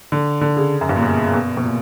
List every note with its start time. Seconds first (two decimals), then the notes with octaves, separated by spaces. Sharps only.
0.12 D3
0.41 D3
0.57 C#3
0.81 F#2
0.89 G2
0.96 A#2
1.02 B2
1.34 B2
1.57 B2
1.64 A#2